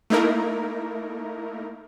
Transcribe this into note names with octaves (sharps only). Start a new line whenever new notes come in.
A3 A#3 D#4 E4 A#4